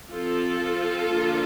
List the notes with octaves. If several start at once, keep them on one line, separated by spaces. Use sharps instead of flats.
F3 C4 F4 A4
D3 F3 A#3 D4